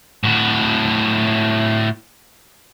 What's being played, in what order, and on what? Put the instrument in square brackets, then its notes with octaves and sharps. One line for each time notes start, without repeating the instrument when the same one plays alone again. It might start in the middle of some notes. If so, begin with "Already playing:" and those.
[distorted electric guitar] A2 F#4